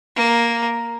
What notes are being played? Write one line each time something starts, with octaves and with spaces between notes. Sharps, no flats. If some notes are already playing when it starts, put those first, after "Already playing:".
A#3